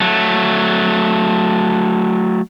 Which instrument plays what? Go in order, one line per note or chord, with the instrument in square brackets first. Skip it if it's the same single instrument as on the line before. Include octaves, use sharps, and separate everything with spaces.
[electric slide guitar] F#3 A3